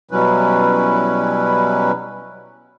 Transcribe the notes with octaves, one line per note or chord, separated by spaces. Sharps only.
B2 F#3 G3 C#4 E4 B4